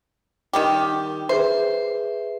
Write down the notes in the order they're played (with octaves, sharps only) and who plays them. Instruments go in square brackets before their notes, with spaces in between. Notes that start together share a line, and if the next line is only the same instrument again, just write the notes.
[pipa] D#3 G3 G4
[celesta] G#4 B4 E5 [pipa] C5